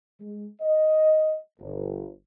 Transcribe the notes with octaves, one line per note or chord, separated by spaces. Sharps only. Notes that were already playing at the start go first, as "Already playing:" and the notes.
G#3
D#5
G1